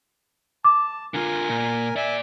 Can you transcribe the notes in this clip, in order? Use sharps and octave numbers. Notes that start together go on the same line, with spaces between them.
A5 D6
D3 F4 A#4 G#5
A#2
A#2 D5 E5 G#5